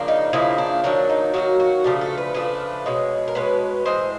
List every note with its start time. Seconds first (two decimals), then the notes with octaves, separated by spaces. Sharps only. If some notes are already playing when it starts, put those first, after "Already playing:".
Already playing: C#3 F3 A#3 D4
0.08 D#4
0.33 C#3 F3 A#3 D4 E4
0.58 D4
0.84 D#3 F#3 A#3 D4
1.09 D#4
1.34 D#3 F#3 A#3 F#4
1.60 F#4
1.84 C#3 F3 A3 D4 G4
2.01 A4
2.18 B4
2.34 C#3 F3 A3 D4 B4
2.86 B2 G#3 C#4
3.28 A#4
3.35 B2 G#3 C#4 B4
3.86 A2 E3 G#3 C5